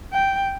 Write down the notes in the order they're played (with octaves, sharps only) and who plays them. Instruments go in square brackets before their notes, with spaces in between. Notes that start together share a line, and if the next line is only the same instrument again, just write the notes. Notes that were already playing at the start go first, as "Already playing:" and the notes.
[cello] G5